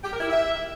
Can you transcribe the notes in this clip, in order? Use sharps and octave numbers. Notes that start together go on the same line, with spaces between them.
G4
A#4
E4
E5